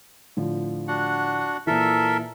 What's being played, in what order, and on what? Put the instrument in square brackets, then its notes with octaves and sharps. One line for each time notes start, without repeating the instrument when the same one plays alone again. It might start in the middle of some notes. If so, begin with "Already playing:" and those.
[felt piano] A2 D3 F3
[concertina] D4 F#4 F#5
[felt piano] A#2 E3 [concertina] A4 A#4 E5